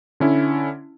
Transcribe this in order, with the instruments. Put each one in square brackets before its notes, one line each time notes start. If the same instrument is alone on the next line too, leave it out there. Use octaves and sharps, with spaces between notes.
[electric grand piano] D3 C#4 E4